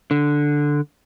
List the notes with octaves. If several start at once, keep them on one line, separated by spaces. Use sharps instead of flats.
D3